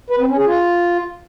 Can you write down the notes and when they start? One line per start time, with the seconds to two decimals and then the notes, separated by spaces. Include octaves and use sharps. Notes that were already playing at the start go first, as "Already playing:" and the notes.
0.10 B4
0.19 C4
0.28 C#4
0.37 G#4
0.46 F4